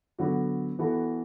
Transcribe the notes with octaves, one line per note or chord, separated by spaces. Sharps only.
D3 F#3 B3 F#4
E3 B3 F#4 A4